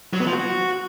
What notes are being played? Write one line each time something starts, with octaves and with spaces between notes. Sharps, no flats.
F#3
B3
F3
F#4